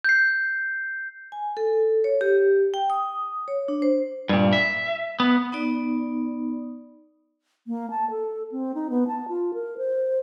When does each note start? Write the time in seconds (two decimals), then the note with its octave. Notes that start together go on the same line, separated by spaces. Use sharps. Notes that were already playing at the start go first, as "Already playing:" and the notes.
0.04 G6 C7
1.32 G#5
1.57 A4
2.04 C#5
2.21 G4
2.74 G5
2.90 D#6
3.48 C#5
3.68 D4
3.82 C5
4.29 G2 A#2
4.53 E5
5.20 B3
5.52 B3 D#4 D5
7.67 A#3
7.91 A5
8.11 A4
8.52 C4
8.75 D#4
8.90 B3
9.08 A5
9.29 F4
9.54 A#4
9.78 C5